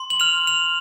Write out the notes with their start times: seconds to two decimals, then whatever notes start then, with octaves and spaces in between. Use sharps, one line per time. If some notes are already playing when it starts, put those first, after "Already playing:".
Already playing: C6
0.10 F#7
0.20 F6 F7
0.47 F6 F7